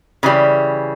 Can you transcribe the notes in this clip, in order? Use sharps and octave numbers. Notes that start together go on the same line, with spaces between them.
C#3 E3 G3